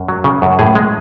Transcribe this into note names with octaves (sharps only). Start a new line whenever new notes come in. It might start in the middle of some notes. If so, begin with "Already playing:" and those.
Already playing: F#2
F#3
C#3
F#2
A2 G#4
G#3